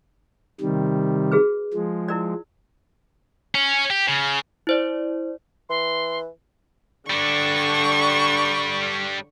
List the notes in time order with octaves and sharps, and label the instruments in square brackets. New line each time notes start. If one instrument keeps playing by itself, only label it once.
[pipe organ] C3 D#3 G3
[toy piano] F#4 G#4 B4
[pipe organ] F3 G#3
[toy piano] E4 A#4 D5
[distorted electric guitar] C#4
G4
C#3
[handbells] E4 C5 D5
[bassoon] E3 [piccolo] C6
[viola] D3 [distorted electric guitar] G3 D4 [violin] C#6